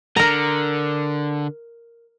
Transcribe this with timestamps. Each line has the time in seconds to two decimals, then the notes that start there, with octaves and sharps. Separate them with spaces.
0.16 D3 A#4 A#5